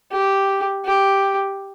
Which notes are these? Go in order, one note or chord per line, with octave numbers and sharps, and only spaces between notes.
G4
G4